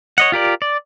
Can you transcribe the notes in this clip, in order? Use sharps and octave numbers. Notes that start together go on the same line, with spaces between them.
C#5 D#5 F#5
F4 G4 A#4 D5
D5